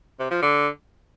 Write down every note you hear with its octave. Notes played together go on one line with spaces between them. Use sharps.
C3
F3
D3